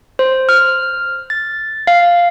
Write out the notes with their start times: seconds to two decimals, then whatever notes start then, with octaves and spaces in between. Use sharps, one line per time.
0.19 C5
0.49 F6
1.30 A6
1.87 F5